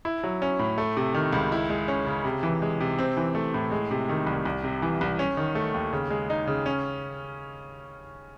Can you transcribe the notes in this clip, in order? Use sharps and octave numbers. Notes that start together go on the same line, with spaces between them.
E4
F#3
C#4
A2
A3
C3
D#3
C#2
E4
G#3
C#4
C#3
C3
E3
G#3
C3
C4
E3
A3
A2
G#3
C3
D#3
C2
C2
C3
E3
C2
C#4
D#3
A3
D#2
C#3
G#3
D#4
C#3
C#4